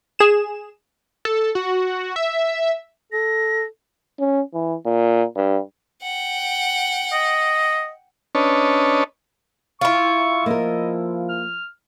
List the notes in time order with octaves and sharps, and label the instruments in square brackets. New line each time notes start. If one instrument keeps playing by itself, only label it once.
[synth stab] G#4 E7
[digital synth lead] A4
F#4
E5
[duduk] A4 [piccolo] A#6
[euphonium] C#4
E3
A#2
G2
[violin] F#5 G5
[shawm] D#5
[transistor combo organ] C#4 D4 B4 C#5 D#5 A5
[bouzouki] E4 F4 [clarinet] C#6
[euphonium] F3 [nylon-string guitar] A#3 A#4 [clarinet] D#5
[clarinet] F6